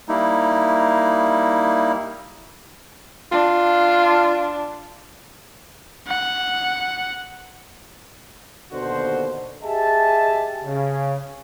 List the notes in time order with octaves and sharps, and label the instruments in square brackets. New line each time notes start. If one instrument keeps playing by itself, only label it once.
[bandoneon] G3 A#3 D#4 E4
[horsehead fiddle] D4 [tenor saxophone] F4
[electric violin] F#5
[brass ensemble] D#2 B2 D3 F#4 C5
G4 G#4 D#5 E5 G#5 A5
C#3